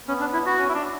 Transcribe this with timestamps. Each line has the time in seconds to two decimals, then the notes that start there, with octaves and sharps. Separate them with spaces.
0.08 B3 C#4
0.21 D4
0.33 E4
0.46 F#4
0.59 C#4
0.69 E4
0.74 D4